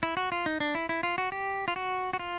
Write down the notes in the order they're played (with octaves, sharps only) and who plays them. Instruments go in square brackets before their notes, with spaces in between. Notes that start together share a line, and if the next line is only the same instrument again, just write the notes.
[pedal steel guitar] E4
F#4
F4
D#4
D4
E4
E4
F4
F#4
G4
F4
F#4
F#4
F4